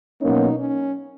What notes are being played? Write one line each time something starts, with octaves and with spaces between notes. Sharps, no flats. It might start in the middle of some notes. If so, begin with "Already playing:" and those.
B2 F#3 A#3 C#4 D#4
C#4